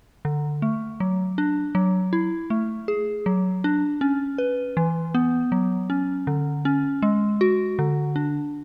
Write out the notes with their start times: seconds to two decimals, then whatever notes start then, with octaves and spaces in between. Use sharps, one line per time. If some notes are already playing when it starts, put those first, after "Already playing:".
0.25 D3
0.62 A3
1.00 F#3
1.38 D4
1.75 F#3
2.13 E4
2.50 A3
2.88 G#4
3.26 F#3
3.64 D4
4.01 C#4
4.38 B4
4.77 E3
5.14 B3
5.52 F#3
5.90 C#4
6.27 D3
6.65 C#4
7.02 G#3
7.41 F#4
7.79 D3
8.16 D4